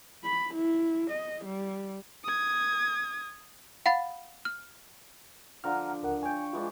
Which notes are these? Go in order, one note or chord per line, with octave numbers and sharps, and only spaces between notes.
B5
E4
D#5
G3
D#6 G#6
F5 F#5 B5 A6
F6
D3 F3 F#5 A#5 F6
C#2 A#4 F#5
C#5 G5 G#5
E3 G#3 D4 F4